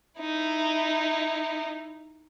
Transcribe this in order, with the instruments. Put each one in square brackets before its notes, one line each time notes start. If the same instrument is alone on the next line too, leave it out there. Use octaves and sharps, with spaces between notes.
[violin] D#4 E4